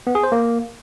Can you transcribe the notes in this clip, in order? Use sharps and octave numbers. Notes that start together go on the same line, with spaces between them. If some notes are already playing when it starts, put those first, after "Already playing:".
B3
G#4
C5
A#3